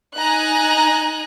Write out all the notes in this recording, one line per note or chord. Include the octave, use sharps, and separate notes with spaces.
D#4 G#5 A#5 F#6